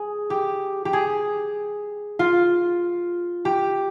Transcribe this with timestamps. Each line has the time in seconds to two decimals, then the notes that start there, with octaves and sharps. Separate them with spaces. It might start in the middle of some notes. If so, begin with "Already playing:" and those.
Already playing: G#4
0.30 G4
0.85 G4
0.93 G#4
2.19 F4
3.45 G4